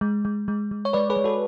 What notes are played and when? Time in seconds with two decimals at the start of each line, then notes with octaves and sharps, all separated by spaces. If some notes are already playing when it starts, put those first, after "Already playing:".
0.01 G#3
0.25 G#3
0.48 G#3
0.71 G#3
0.85 C#5
0.93 G#3 B4 D5
1.10 G#4 B4
1.17 G#3
1.24 F#4 A4